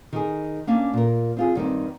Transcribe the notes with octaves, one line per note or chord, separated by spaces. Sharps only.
D#3 G#4
A#3 C#4 D4
A#2 A#4
C4 F4 G#4
G2 D#3 B3 C4